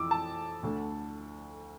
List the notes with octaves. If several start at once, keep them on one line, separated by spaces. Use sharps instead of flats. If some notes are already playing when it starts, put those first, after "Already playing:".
Already playing: F2 E3 D6 E6
A5
D2 D3